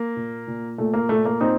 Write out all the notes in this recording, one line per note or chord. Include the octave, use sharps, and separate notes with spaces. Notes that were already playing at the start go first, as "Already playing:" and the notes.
Already playing: A#3
A#2
A#2
A#2 A3
A#3
A#2 A3
A#3
A#2 C4 D#4